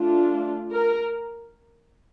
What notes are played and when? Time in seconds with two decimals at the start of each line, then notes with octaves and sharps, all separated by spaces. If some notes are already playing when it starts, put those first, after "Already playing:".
Already playing: A3 D4 F4
0.72 A#4